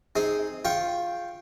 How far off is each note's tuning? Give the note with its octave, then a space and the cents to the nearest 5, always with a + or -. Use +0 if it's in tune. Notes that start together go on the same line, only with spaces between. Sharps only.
C4 +0 D#4 +0 G#4 +0
F4 +0 G5 +0 C#6 -30